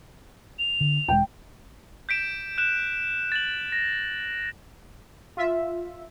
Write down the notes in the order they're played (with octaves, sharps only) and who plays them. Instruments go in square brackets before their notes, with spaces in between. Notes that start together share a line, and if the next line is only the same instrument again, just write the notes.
[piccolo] F7
[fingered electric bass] D3
[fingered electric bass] E1 G#3 [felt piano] G5
[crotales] G6 B6 D7 E7
F#6 E7
A6 F#7
A#6
[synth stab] F4 E5